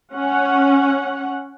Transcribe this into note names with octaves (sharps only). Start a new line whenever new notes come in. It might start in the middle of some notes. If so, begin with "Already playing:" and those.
C#4 F#5